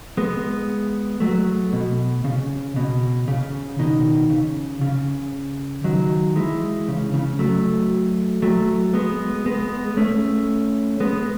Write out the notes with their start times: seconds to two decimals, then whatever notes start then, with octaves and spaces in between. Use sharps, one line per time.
0.17 G#3 B3
1.20 F#3 A3
1.73 B2
2.24 C#3
2.76 B2
3.28 C#3
3.79 B2 D#3
4.30 C#3
4.81 C#3
5.84 D#3 F#3
6.36 E3 G#3
6.88 C#3
7.14 C#3
7.39 F#3 A3
8.42 F#3 A3
8.93 G#3 B3
9.46 G#3 B3
9.97 A3 C#4
11.00 G#3 B3